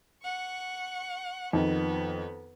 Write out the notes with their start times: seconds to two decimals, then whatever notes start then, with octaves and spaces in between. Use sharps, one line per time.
0.23 F#5 C#6
1.53 F2 D#3 B3